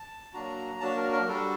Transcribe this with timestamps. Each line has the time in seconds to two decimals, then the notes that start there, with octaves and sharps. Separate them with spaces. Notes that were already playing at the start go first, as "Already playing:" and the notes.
Already playing: A5
0.34 F#3 A#3 D4 F#4 A#5
0.80 F#3 A#3 D4 F#4 A5
0.97 A#4
1.12 A#4
1.28 G3 D4 F#4 A4